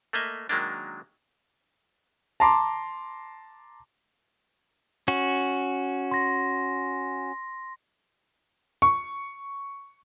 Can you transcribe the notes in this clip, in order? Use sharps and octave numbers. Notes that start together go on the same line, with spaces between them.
A3 A#3 D#5 E5
D#3 F#3 G#3 A#3 D4
A5 A#5 C6 D6
C#4 F#4
C6 A#6
C#6